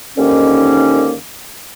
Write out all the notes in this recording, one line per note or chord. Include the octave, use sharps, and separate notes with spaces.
D#2 G#2 D3 D#3 A#3 C#4